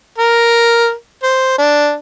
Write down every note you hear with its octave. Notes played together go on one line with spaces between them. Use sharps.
A#4
C5
D4